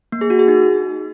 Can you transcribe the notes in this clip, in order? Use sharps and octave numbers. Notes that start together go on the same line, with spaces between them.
A#3
G#4
F#4
G#4
D#4